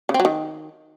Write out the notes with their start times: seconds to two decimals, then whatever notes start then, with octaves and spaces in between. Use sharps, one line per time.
0.09 C#3
0.14 C4
0.20 F#3
0.25 D#3